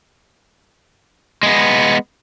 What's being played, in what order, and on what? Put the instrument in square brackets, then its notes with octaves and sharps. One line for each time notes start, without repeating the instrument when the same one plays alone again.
[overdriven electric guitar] G#3 B3